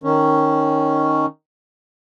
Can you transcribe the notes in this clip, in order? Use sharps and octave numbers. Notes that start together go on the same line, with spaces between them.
D#3 C#4